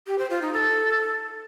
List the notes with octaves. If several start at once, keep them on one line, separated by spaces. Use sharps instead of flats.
G4
C5
F4
D#4
A4